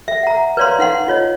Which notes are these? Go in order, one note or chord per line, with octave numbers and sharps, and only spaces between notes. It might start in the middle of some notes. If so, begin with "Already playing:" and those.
E5
F#5 A#5
B4 C#5 D5 F5 A#5 C6
D#4 F5 F#5 C6
D#4 F4 C#5 D#5